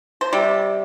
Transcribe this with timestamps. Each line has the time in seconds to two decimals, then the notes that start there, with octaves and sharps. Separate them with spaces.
0.21 C5
0.33 C3 G3